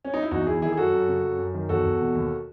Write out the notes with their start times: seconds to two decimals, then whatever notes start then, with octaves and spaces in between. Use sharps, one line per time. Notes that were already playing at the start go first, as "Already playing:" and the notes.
0.05 C#4
0.14 D#4
0.23 E4
0.31 E2 D#4 F#4
0.47 E2 E4 G#4
0.62 D#3 E4 G#4
0.72 G#4
0.77 F#2 F#4 A4
0.93 F#2
1.08 C#3
1.24 F#2
1.39 F#2
1.54 D#3
1.69 E2 F#4 A4
1.85 E2
2.00 B2
2.15 D#2